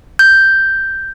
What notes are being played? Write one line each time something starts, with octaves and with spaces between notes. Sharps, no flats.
G6